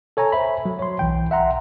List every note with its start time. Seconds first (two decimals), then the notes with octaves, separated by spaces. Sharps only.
0.17 A4 C#5 G#5 A#5
0.32 C5 E5 B5
0.65 F#3
0.79 C#5 C6
0.99 B1 E3 G5
1.31 E5 F#5 A#5 C6